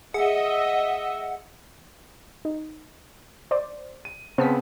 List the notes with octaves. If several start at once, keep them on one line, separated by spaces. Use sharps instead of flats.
G#4 D#5 E5 F#5
D#4
C5 D5
D#7
C#3 B3 C4 C5 A5 B6